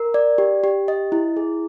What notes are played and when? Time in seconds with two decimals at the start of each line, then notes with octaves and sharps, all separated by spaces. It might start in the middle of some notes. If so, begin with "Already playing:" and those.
Already playing: A#4
0.14 D5
0.38 G4
0.64 G4
0.88 D#5
1.12 E4
1.37 G#4